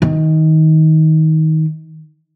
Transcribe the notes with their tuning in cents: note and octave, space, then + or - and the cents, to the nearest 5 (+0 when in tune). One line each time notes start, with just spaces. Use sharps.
D#3 +20